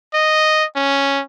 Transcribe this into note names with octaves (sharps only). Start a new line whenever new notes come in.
D#5
C#4